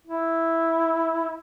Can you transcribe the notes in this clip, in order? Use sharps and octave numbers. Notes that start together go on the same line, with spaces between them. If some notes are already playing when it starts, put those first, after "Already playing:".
E4